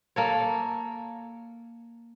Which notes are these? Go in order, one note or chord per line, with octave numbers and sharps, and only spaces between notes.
A#3 A4 C#5